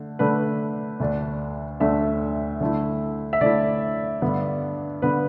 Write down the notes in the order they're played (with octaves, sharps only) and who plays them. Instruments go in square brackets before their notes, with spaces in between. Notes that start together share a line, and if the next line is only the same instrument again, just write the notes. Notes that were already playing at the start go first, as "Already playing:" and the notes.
Already playing: [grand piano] D3 A3
D3 A3 D4 B4
D2 D3 A3 D4
D2 D3 A3 D4 E5
D3 A3 E4
E5
D3 A3 E4 D5
G2 D3 B3
D3 B3 B4